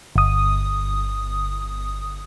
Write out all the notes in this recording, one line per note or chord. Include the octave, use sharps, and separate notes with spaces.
G1 D#6